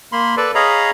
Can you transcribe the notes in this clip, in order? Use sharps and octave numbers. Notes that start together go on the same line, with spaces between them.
A#3 B5 C6
A4 B4 D5
G#4 C#5 D#5 F5 A#5 B5